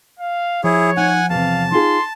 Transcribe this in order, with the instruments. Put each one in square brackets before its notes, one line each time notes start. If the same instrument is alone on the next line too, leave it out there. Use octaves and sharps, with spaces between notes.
[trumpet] F5
[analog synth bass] F3 [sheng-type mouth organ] E4 G#4 [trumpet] C#5
[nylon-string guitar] D#4 [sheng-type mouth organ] F#5 G#5
[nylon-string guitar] E2 C3 [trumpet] F5 [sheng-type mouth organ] A5
[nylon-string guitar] D#4 F4 G#4 [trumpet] C6